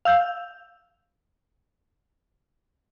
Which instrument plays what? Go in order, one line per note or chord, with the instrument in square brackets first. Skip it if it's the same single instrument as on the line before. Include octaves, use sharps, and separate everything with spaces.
[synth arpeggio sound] F5 E6 G6